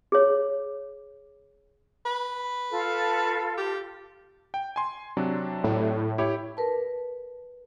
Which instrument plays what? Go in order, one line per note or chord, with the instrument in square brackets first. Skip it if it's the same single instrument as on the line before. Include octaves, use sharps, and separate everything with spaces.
[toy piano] G#4 C#5
[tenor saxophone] B4
[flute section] F4 A4
[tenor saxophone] G4
[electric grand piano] G5
G#5 C6
C3 F#3 D4
[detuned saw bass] A2
[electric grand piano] E4 G4 C#5
[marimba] A#4 B4 A5